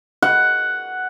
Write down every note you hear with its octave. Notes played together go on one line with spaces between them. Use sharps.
F#5